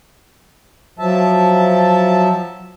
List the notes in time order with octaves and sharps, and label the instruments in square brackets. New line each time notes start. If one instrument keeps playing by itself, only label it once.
[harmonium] F3 F#3 E5 A5